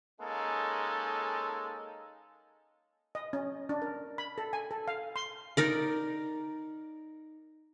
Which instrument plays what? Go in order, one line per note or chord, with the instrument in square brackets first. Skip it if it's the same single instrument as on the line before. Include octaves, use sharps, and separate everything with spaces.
[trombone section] G#3 A#3 C#4 D#4 A4
[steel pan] D#5
C#4
D4
A#4
B5
A4
G#5
A4
F5
C6
[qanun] D#4 A#4 D5